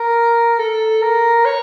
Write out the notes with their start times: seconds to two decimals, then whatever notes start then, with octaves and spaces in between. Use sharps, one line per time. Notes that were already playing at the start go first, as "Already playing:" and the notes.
Already playing: A#4
0.59 A4
1.02 A#4
1.45 C#5